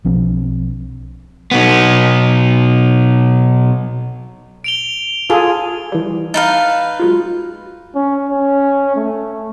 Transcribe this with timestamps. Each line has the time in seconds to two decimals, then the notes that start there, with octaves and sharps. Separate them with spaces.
0.05 B1 F3 C4 D4
1.51 B1 B3
4.64 D7 F7 G7
5.30 F4 G#4 A4
5.92 E3 G3
6.34 D#4 B4 F5 A5
6.99 F#3 G#3 F4
7.95 C#4
8.29 C#4
8.96 A3